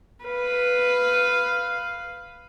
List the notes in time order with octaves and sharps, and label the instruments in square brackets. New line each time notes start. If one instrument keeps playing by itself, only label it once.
[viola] B4 F5